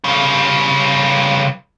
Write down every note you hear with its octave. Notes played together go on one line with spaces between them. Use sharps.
C#3 G3